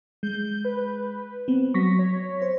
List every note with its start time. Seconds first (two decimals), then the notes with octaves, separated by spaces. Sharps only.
0.23 G#3 G6
0.65 B4
1.48 B3 C4
1.74 F#3 C#6 A#6 B6
1.99 C#5
2.42 C5